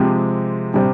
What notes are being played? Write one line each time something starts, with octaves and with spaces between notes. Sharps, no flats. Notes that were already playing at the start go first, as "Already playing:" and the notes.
Already playing: C3 F3 G#3 C4 G4
C3 G3